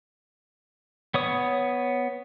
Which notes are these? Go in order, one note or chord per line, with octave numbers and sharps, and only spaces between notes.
B3 C#5 D#6